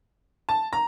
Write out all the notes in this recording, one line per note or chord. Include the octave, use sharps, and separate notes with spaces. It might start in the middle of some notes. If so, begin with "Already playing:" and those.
A5
A#5